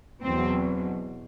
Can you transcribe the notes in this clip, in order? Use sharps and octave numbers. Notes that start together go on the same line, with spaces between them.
E2 B2 F#3 C4